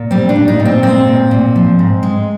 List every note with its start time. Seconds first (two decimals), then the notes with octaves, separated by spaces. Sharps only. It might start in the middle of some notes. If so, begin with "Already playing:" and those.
Already playing: A#2
0.11 G3 C4
0.29 D4
0.36 A#2
0.48 D#4
0.60 A#2
0.65 C4
0.83 G#3 C4
1.08 A#2
1.31 A#2
1.56 F3
1.79 G#2
2.03 G#3